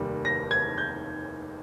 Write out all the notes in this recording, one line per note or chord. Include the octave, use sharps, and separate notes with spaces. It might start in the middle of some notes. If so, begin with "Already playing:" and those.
Already playing: F1 D#2 D#3 G3 A#3
A#6
G#6
G6